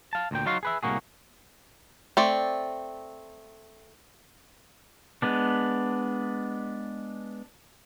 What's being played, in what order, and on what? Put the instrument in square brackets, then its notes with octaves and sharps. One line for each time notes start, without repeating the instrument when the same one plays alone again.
[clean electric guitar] F5 A5
D2 A#2 G5
F#3 D#4 F4 F#4 F5
G#4 B4 E5
C2 A2 C#3 A#3 F#4 G#4
[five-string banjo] A3 C4 D5
[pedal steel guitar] G#3 B3 D4